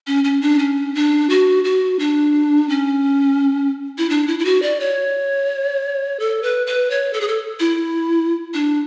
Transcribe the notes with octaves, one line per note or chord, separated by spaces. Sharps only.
C#4
C#4
D4
C#4
D4
F#4
F#4
D4
C#4
E4
D4
E4
E4
F#4
D5
C#5
A4
B4
B4
C#5
A4
G#4
A4
E4
D4